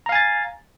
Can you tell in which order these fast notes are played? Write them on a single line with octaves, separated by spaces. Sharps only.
A#5 F5 G#5 A6